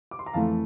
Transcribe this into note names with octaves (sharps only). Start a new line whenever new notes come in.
D6
C6
A#5
F2 E3 A3 F5 A5